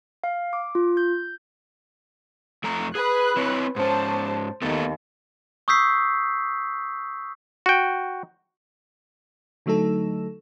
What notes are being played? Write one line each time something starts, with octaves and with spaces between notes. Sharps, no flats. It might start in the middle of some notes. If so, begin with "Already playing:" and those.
F5
D6
F4
G6
F2 A3 A#5
G#4 B4 F#6
C4 E4 C#5
G#2 C#4 C5 A5
D#2 A3 B3 A4
C#6 D#6 E6 G6 B6 C7
F#4 G5
D3 F#3 A3 D#4 A4